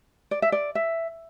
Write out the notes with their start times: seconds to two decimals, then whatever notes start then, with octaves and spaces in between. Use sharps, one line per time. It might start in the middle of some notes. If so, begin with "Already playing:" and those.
0.31 D5
0.42 E5
0.52 D5
0.75 E5